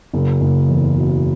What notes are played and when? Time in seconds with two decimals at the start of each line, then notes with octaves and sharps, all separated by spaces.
0.13 F#1
0.41 F#1
0.69 E2
0.96 B2